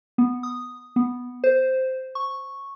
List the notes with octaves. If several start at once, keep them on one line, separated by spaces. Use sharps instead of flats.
B3
D#6
B3
C5
C#6